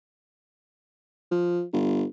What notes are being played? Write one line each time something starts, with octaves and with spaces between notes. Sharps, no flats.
F3
G1